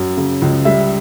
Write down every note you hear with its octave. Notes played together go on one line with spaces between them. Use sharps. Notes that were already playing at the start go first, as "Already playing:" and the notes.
Already playing: F#2
C#3
C#2
G3 E5